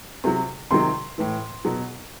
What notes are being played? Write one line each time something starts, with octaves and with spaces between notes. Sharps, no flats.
C3 F#3
C3 D#3 F#3 C6
A2 E3
B2 F#3